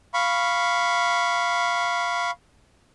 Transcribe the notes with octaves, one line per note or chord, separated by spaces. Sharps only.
F5 B5 C#6